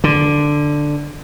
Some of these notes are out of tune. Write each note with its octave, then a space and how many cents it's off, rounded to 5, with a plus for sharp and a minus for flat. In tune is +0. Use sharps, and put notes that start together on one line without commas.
D3 +5